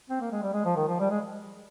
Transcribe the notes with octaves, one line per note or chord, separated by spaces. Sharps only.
C4
A#3
G#3
G3
G#3
F3
D#3
F3
G3
G#3